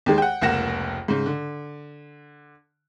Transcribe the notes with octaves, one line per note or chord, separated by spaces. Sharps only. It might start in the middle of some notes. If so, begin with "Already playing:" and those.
D#2 D#3 G#3
F#5 G5
F1 C#2 A#3 F#5 A#6 E7
G#2 C#3
D3